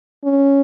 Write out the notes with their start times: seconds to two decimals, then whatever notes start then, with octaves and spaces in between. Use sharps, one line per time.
0.24 C#4